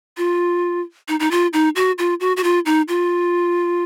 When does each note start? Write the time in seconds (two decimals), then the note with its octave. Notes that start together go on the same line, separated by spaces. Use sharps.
0.17 F4
1.08 D#4
1.20 D#4
1.31 F4
1.53 D#4
1.76 F#4
1.98 F4
2.20 F#4
2.37 F#4
2.44 F4
2.66 D#4
2.88 F4